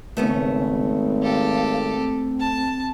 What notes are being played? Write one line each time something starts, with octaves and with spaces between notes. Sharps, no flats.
G#1 C#3 A3 B3 C#4
G4 A4 F5
C4
A5